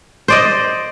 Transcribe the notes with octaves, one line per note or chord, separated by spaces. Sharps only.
C5 D5 D#5